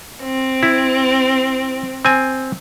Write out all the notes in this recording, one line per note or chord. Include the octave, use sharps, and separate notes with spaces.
C4
E4
C4 G#5